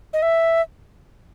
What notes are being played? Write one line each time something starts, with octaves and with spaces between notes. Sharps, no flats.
D#5
E5